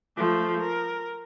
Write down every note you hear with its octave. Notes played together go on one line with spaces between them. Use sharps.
F3 A3
A#4